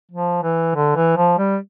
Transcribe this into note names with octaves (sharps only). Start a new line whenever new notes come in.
F3
E3
D3
E3
F3
G3